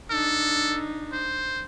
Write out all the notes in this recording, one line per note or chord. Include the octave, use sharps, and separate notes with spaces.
D4 D#4 A4
C5